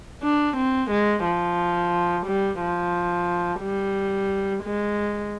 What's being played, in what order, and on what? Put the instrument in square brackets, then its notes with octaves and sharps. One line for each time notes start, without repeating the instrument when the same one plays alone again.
[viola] D4
C4
G#3
F3
G3
F3
G3
G#3